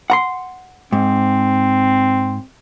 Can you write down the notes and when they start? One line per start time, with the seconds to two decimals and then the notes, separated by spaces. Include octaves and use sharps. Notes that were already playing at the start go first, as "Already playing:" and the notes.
0.10 F#5 A#5 C6
0.93 G#2 C4